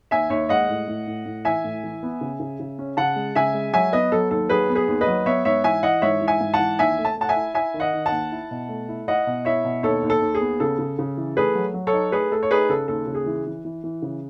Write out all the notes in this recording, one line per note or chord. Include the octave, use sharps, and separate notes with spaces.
D#2 E5 G#5
D#2 C#5 E5
G#3 D#5 F#5
A2
A2
A2
A2
E3 E5 G#5
A2
E3
B3
C#3
C#3
C#3
C#4
C#3 F#5 A5
G#3
C#3 E5 G#5
G#3
F#3 E5 G#5
B3 B4 D#5
F#3 A4
D#2 A4
F#3 G#4 B4
B3
G#4 B4
D#2
B4 D#5
F#3
B3 C#5 E5
G#2 C#5 E5
E3 E5 G#5
E3 D#5 F#5
G#2 C#5 E5
E3
E5 G#5
G#2
F#5 A5
E3
D#2 E5 G#5
A3
A5
A3 F#5 A5
E5 G#5
E4
E4 E5 G#5
D#3
D#5 F#5
D#3
F#5 A5
D#2
E4
B2
A3
E4
E4 D#5 F#5
B2
E4 C#5 E5
B2
D#2 A4 C#5
D#2
A4
D#2
G#4
B3
C#3 A4
C#3
C#3
E3
A3 G#4 B4
F#3
F#3
A4 C#5
D#4
A3 G#4 B4
A3 A4
C#5
D#4 G#4 B4
C#3 A4
D#2 A4
C#3
G#4
E3
E3
E3
E3
C#3